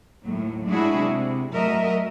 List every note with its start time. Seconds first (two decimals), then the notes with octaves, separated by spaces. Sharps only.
0.24 D#2 A2 F#3
0.68 F#3 G#3 D4 E4 F#4 G#4
0.98 C3
1.52 F#3 A3 F#4 A#4 D#5 E5